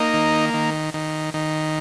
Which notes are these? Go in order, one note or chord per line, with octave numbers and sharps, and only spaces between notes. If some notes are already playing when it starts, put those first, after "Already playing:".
Already playing: A#3 D#4
D#3
D#3
D#3
D#3